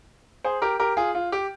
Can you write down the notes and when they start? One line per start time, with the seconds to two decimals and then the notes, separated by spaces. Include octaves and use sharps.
0.44 G#4 C5
0.62 G4 A#4
0.80 G4 A#4
0.97 F4 G#4
1.15 F4
1.32 G4